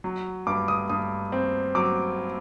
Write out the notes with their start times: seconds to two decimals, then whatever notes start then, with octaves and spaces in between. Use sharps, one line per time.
0.04 F#3
0.47 G2 D6
0.68 D#6
0.89 G2 D#6
1.32 C4
1.75 F#3 D6